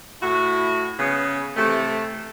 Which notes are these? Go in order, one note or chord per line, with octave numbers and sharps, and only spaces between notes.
A2 E4 F#4
C#3 B3
C3 E3 A3